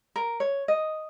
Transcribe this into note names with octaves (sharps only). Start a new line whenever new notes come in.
A#4
C#5
D#5